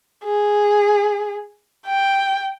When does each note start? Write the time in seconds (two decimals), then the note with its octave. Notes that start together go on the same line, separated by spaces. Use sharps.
0.24 G#4
1.87 G5